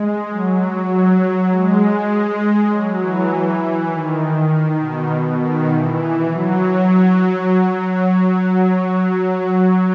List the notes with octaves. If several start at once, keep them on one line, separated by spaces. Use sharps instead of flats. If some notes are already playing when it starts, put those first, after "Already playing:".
Already playing: G#3
F#3
F#3
G#3
F#3
E3
E3
D#3
D#3
B2
D#3
E3
F#3